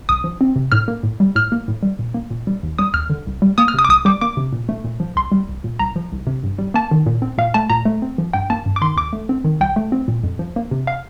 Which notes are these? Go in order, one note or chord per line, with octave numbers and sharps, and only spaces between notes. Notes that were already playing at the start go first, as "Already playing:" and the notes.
C2 D#6
F3
C4
C3
A2 F6
A#3
A2
G3
A2 F6
A#3
A2
G3
A#2
A#3
A#2
G3
D#2
G3 D#6
D#2 F6
D3
C2
G3
A#3 D#6
F6
C3 D#6
D6
C2 D#6
G3 D6
A#3 D6
C3
A#2
A3
A#2
F3
C2 C6
G3
C2
A#2
C2 A#5
F3
C2
C3
G2
G3
A#3 A5
D#3
A#2
C4
A#2 F5
A3 A5
A#2 A#5
A3
C4
F3
G2 G5
A#3 A5
G2
D6
D#3 C6
D#2 D6
A3
C4
D#3
C2 G5
A3
C4
A#2
F2
F3
A#3
C3
F5